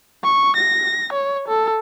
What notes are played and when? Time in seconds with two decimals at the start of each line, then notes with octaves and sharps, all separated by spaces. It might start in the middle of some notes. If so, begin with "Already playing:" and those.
0.24 C#6
0.56 A#6
1.13 C#5
1.48 A4